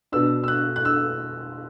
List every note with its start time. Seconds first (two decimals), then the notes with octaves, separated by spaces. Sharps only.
0.12 B2 B3 D4 E6
0.44 E6
0.48 F#6
0.76 F#6
0.85 E6